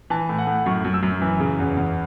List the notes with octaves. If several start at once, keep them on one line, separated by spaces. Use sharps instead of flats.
E3 A5
A2
F#5
A2
F#2 C#6
F#2
E6
F#2
E3
C#3
E2
E2